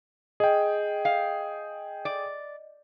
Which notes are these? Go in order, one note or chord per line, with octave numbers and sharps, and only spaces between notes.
G#4 D#5 G5
F5
D5